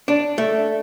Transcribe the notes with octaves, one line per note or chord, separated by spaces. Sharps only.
D4
A3